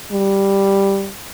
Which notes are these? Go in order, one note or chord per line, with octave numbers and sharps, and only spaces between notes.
G3